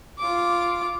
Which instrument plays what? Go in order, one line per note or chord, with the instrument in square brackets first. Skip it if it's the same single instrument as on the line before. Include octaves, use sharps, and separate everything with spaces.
[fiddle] F4 D6